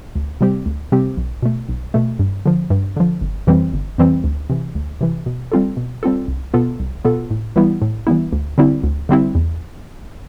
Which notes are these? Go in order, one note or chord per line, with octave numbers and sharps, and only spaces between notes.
D2
C3 G3 C4 G4
D2
C3 G3 C4 G4
B1
B2 A3
B1
B2 A3
G2
D3 F3
G2
D3 F3
G1
F2 E3 G3 C4
G1
F2 E3 G3 C4
D2
C3 E3
D2
C3 E3
B2
G3 C4 F4 A4
B2
G3 C4 F4 A4
C2
B2 B3 F4 A4
C2
B2 B3 F4 A4
A2
E3 G3 B3 E4
A2
E3 G3 B3 E4
D2
D3 G3 C4 E4
D2
D3 G3 C4 E4
E2